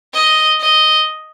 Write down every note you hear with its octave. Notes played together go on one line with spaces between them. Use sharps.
D#5
D#5